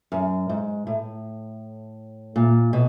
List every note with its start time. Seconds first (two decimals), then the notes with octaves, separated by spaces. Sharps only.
0.12 F#2
0.49 G#2
0.87 A2
2.36 A#2
2.73 B2